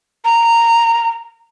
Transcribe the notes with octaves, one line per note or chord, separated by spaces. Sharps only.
A#5